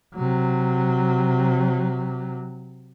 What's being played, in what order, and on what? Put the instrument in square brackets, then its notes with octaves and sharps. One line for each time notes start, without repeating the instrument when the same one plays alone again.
[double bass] C3 F#3